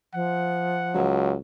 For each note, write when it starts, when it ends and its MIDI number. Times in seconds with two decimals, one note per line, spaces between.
0.14 1.05 53
0.14 1.05 78
0.95 1.37 37
0.95 1.35 54